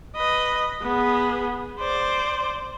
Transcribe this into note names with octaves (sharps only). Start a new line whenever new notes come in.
B4 D#5
B3 G#4
C5 D5